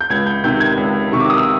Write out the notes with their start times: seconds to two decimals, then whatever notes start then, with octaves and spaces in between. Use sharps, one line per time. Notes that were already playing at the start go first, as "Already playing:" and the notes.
0.01 G6
0.10 C#2 G#6
0.26 G6
0.44 C3 D#3 G6
0.60 G#6
0.77 C#2
1.11 C3 D#3 C#6
1.20 D6
1.30 D#6
1.37 E6